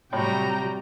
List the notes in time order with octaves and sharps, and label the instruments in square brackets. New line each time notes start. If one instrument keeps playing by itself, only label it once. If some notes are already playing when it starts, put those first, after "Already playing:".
[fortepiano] A2 [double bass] C3 [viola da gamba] F#3 G3 [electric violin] G5 A#5